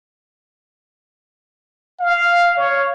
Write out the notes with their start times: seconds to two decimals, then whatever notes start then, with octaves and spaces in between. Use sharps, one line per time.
2.00 F5
2.57 C#5